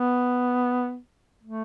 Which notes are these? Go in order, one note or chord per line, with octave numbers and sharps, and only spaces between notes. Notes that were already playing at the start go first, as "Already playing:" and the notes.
Already playing: B3
A3